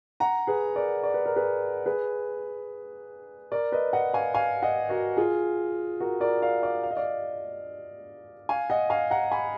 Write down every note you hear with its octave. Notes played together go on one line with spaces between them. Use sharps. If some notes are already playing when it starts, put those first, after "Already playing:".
F#5 A#5
G#4 B4
A#4 D5
D5
B4
A#4
G#4 B4
G#4 B4
A#4 D5
B4 D#5
D#5 F#5
F5 G#5
F5 G#5
D#5 F#5
F#4 A#4
F4 G#4
F#4 A#4
A#4 D5
D5 F5
D5 F5
F5
D#5
D5 F5
F5 G#5
D#5 F#5
F5 G#5
F#5 A#5
G#5 B5